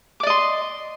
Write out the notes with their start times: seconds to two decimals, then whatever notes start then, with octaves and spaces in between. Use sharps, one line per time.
0.20 D6
0.23 D5
0.27 D#5
0.30 C6